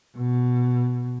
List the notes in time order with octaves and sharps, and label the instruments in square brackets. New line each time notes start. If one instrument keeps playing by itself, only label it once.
[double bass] B2